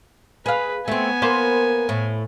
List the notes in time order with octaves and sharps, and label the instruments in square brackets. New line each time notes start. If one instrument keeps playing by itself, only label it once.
[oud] G#4 F5 [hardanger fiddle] B4
[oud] A3 C4 [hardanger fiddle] B3 G#5
[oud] A#3 B4 C5
A2